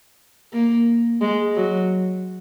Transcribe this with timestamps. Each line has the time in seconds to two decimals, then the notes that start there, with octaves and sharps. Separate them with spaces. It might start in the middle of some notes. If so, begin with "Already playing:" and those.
0.53 A#3
1.21 G#3
1.55 F#3